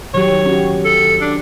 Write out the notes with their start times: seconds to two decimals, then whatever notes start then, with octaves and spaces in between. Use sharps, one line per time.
0.14 D#3 F#3 G4 C#5
0.46 C#4 F#4 G4
0.85 A4
1.21 D4